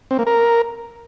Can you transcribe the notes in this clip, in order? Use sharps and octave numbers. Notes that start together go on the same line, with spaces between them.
C4
A#3
A#4